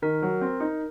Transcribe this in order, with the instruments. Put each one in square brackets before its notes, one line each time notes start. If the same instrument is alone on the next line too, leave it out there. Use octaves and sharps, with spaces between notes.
[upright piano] D#3 [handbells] A#4
[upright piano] F#3
C4
D#4